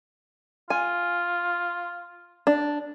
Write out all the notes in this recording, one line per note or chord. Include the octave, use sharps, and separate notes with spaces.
F4 G#5
D4